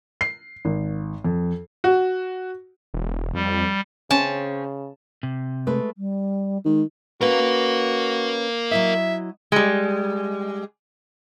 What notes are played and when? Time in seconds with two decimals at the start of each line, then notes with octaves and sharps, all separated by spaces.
0.21 C7
0.65 G#1
1.24 F2
1.84 F#4
2.94 E1
3.34 F2 G3
4.11 C#3 C4 C#4 A5
5.23 C3
5.67 G#3 A3 B4
5.98 G3
6.65 D#3 G#3
7.21 C#4 F#4 A#4 B4 F5
8.71 F#3 E4 D#5 E5
9.52 G3 G#3